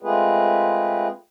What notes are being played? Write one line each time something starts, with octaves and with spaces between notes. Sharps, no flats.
G#3 A3 C4 F4 G#4 B4